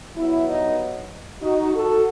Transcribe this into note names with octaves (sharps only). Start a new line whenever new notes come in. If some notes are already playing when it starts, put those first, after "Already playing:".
G2 F#3 B3 E4
D#4
D#4 F#4
F#4 A4